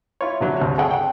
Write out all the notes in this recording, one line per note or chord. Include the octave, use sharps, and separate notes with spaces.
E4 F4 C#5
A#1 D3 F#3 E4
D2 C3
G#4 A4 F#5 G5 C#6
F#5 G5